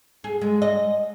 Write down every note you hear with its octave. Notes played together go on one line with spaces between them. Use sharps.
G#4
G#3
D#5